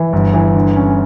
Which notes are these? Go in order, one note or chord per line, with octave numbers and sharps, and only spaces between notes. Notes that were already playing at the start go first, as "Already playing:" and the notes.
Already playing: E3
G1
E3
D3
C#4